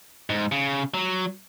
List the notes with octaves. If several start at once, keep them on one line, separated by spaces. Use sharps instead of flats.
G#2
C#3
F#3